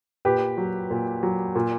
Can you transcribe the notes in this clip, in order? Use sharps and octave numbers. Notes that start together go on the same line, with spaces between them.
A#2 G4 B4
F#3
A#2
F#3
A#2